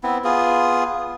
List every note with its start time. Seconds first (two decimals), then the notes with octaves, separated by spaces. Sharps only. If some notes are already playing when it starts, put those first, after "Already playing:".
0.03 B3 C4 E4
0.24 B3 F4 G#4